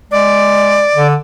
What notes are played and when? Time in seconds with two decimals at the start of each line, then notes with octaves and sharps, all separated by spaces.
0.11 G#3 D5
0.96 D3